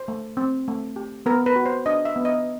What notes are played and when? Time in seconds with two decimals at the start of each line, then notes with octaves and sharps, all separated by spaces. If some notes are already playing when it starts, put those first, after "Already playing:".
Already playing: C5
0.08 A3
0.37 C4
0.68 A3
0.96 G4
1.26 B3 A#4
1.46 B4
1.56 F#4
1.66 C5
1.86 D4 D#5
2.05 E5
2.16 B3
2.25 D#5